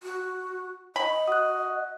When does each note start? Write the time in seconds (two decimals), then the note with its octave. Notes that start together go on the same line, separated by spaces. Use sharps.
0.03 F#4
0.96 D#5 B5
1.28 F#4 D#6 F#6